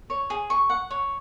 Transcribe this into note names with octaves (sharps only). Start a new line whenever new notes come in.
C#5
G#4
C#6
F#5
C#5